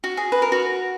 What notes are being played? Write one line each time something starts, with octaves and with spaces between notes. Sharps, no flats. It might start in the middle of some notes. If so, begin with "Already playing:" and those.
F#4
G#4
B4
A#4
F#4